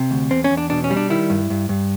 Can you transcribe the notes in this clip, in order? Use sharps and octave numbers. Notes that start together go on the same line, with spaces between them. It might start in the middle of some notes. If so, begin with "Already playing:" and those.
Already playing: C3
D2
E2 C4
C#4
E2
D4
B2 D4
C#4
G3
D4
D#3 E4
G2
G2
G2